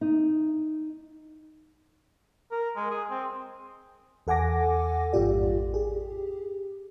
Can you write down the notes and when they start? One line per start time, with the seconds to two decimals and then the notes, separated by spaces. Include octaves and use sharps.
0.01 D#4
2.51 A#4
2.76 G#3
2.91 G#4
3.10 C4
4.27 E2 A4 F#5 G#5 D6 A#6
5.13 A1 F2 G#2 F4 G4 D5
5.74 G4 G#4